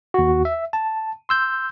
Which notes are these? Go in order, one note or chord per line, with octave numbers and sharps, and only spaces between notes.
D#2 F#4
E5
A5
C6 E6 G6